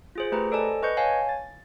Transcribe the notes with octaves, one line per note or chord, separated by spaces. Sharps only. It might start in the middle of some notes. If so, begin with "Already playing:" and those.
F4 G#4 C5
A3 G4 B4 A#5
A4 C5 D5 D#5 G#5 A5
B4 D#5 C#6 F#6 G6 C#7
C#5 F5 G#5 A5
A6